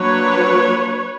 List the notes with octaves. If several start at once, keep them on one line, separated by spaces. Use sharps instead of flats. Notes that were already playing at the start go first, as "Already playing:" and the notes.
Already playing: F#3 A#3 D4 B4 C#5